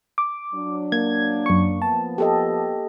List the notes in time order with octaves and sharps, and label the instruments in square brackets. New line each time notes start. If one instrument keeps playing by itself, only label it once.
[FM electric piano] D6
[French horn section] F#3 D4
[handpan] A#3 [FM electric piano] G#6
[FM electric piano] F#2 C#6
[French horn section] F3 B3 [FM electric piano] A5
[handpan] G4 A4 D#5